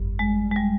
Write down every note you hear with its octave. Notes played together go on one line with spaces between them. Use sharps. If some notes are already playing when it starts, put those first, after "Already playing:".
Already playing: G1 F2 G3
G#3
G#3
G3